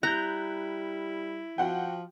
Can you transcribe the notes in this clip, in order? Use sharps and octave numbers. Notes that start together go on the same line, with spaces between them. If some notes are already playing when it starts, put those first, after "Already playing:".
G3 E4 A#5 F#6 G6
F3 F#4 F#5 G5